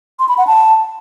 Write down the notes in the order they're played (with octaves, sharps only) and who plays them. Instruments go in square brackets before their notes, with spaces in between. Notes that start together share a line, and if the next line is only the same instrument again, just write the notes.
[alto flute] C6
B5
F#5
A5